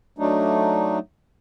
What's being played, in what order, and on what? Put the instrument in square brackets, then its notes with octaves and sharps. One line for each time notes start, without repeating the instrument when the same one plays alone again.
[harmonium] F#3 A3 D4 D#4